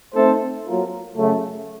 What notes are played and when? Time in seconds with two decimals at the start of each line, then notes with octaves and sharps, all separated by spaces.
0.15 A3 C4 D#4 A4 C5
0.65 F#3 A#3 F4 A#4
1.15 F#2 C#3 F#3 A3